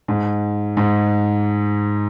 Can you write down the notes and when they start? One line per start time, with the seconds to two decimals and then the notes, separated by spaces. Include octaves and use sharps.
0.08 G#2
0.77 G#2